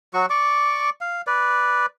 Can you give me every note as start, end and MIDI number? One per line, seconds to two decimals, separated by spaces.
0.14 0.26 54
0.14 0.26 66
0.14 0.26 85
0.30 0.90 74
0.30 0.90 85
0.30 0.90 86
1.01 1.21 77
1.27 1.86 71
1.27 1.86 74